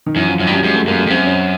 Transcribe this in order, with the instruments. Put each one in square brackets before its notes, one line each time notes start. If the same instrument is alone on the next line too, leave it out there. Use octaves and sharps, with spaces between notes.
[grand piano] D#3
[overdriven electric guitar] F#2 [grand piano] E3
[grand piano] F3
[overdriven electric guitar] F#2 [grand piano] F#3
[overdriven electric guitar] G2
[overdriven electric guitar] F#2 [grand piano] G3
[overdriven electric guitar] F#2 [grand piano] G#3
[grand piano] A3
[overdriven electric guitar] F#2 [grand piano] A#3
[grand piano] G#3
[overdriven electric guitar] F2
[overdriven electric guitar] F#2 [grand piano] C4
[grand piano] C#4